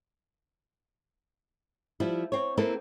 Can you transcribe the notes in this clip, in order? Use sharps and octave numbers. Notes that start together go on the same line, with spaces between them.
F3 G3 E4
C4 C#5
A#3 C4 E4 A4 B4